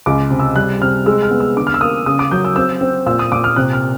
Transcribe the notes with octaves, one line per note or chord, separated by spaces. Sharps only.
C#2 D6
C3
E6
G3 F#6
C3 F6
G#3 E6
F6
B3
E6
D3 D6
F6
E6
A#3 D#6
C#3 D#6
D6
F#3 G6
E6
C4 E6
C4
A#2 E6
D#6
A#2 D6
F6
C3 F#6
F6